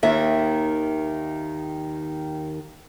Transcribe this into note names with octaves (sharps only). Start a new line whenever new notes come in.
D#2 D#3 E5